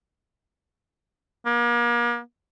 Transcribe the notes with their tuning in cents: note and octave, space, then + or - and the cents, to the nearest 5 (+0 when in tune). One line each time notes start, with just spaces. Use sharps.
A#3 +40